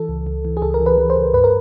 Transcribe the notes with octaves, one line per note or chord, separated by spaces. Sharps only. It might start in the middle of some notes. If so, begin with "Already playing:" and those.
Already playing: E3 A4
C#2
C#2
E3
G#4
C#2 A4
A#4
E3
B4
E3
C5
C#2
G2 B4
A#4